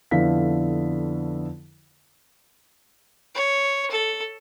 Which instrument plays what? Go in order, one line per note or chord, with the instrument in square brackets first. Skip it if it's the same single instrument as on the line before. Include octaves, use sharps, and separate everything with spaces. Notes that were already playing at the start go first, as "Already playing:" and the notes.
[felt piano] F2 D3 B3 E4 F5 B6
[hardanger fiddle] C#5
A4